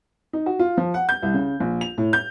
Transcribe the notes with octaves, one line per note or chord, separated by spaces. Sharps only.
D#4
F#4
F4
F3
F#5
G6
C2
C#3
A#1
F7
A2
G6